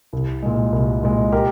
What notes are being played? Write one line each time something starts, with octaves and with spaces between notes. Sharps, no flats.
C2
A#2 G#3
C2
A#2 G#3
G4 A#4